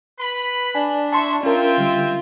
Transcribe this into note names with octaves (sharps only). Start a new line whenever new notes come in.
B4 B5
D4 G#5
E4 E5 A5 C6 C#6
C4 C#4 F4 A#4 E5 G5
D3 G3